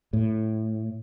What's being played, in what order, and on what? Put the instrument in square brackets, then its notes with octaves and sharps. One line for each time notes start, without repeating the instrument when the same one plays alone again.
[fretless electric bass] A2